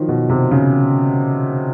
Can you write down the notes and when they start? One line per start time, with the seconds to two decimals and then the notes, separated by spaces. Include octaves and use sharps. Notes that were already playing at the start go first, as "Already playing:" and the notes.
Already playing: D#3 F3 F#3
0.08 B2
0.29 C3
0.51 C#3